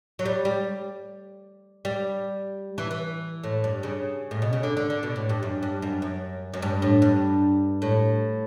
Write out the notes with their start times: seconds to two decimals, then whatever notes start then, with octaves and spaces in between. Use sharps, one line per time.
0.19 F#3
0.25 G3
0.45 G3
1.85 G3
2.78 E3
2.91 E3
3.44 A2
3.64 G2
3.83 C#3
4.31 A2
4.42 B2
4.53 C#3
4.63 D3
4.77 D3
4.90 D3
5.03 B2
5.16 A2
5.29 G2
5.43 F#2
5.63 G2
5.82 F#2
6.02 F#2
6.54 F#2
6.62 G2
6.82 A2
7.02 G2
7.82 A2